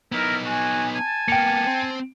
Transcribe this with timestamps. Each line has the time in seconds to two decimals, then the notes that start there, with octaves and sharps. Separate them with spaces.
0.12 B3 D#4 E4 A#4
0.45 F#4 G#5
0.95 G#5 A5
1.28 A#3 B3 G5 C#7
1.67 C4